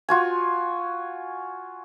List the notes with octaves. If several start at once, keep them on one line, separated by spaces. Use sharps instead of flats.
F4 F#4 G#5